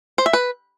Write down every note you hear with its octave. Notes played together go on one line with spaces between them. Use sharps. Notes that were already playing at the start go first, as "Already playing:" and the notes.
C5
E5
B4